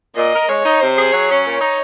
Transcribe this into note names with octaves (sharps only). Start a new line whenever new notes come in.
A#2 D#5
A#4
G#3 C#5
D#4
C3 C5
G#4
F#3 C#5
C#4
A#2 C#5
D#4